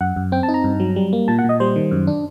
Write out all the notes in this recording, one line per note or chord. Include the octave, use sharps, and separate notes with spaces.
F#2 F#5
F#2
C4 G5
A5
D#4
A#5
G2
F#3
G3
A#3
A#2 A5
F#5
A#2
D#5
G3 C5
D#3
F#2
D4